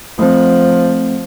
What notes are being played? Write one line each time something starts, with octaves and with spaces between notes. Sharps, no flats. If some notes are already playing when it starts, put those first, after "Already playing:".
F3 A3 C4